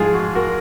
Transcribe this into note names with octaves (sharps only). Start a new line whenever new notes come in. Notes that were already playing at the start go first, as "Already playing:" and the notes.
Already playing: G#2 F3 G#3 F4 G#4
F#4
F#4 A#4